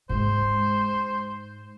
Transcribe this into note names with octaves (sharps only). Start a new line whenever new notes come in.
G#2 G#3 C5